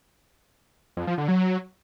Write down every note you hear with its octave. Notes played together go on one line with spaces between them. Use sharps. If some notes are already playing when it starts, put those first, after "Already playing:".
F2
F3
D3
F#3